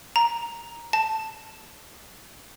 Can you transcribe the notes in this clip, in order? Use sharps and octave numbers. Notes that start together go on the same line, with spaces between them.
A#5
A5